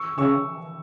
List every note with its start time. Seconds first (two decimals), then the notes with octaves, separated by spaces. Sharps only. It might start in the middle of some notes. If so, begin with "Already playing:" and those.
Already playing: C#6 E6
0.18 C#3 C#6 E6